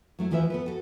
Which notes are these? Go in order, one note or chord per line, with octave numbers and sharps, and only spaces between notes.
F#3 A3 E4
D#2 E3 F3 B4 C#5 E5
B3 A4 B4
F#4 A4